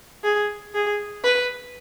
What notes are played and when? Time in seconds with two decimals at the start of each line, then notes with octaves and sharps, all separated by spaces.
0.24 G#4
0.74 G#4
1.24 B4